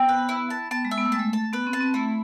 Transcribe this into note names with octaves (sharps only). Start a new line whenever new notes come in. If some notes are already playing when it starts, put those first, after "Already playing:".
Already playing: B3 C4
B4
E4
A5
B3 A5
G#3
E5
B3
A3
G#3 A5
A3
A5
B3 B4
C4
A5
C4
A3 E4